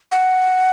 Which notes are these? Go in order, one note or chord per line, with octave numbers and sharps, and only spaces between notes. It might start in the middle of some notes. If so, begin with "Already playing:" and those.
F#5